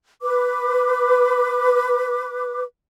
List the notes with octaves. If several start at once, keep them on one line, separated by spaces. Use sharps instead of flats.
B4 D6